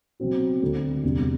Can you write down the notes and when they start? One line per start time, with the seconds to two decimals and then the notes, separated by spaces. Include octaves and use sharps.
0.20 B2 F#3 C4 F#4
0.62 D2 D3 A3 C4
1.03 E2 C3 G3 D4